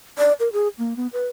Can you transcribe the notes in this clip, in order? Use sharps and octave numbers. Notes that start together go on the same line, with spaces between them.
D5
A#4
G#4
A#3
B3
B4